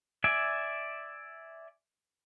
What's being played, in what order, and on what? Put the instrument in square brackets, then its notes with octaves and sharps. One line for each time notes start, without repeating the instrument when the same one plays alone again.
[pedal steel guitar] D5 E5 G#5